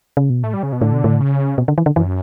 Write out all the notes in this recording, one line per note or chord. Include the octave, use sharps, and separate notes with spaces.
C#3
B2
A2 A3
G3
C#3
B2
A2 D3
B2
A2
C#3
B2
D3
E3
D3
F#2 E3